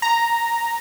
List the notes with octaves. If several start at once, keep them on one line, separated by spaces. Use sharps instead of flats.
A#5